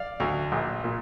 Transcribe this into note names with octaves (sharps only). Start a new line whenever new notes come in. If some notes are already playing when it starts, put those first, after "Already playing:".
Already playing: D5 F5
D2
A#1
A#2